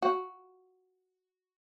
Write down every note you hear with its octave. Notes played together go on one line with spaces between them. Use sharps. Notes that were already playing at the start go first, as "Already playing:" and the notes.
F#4